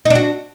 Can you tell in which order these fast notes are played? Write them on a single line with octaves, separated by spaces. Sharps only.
D#4 D4 F#4